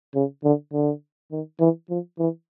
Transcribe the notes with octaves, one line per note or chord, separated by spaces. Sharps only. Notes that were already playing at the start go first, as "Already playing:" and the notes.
C#3
D3
D3
D#3
E3
F3
E3